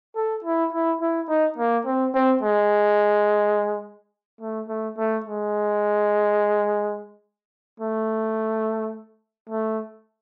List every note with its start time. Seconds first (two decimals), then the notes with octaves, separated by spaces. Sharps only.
0.16 A4
0.44 E4
0.73 E4
1.01 E4
1.29 D#4
1.58 A#3
1.86 C4
2.14 C4
2.43 G#3
4.41 A3
4.68 A3
4.98 A3
5.26 G#3
7.80 A3
9.49 A3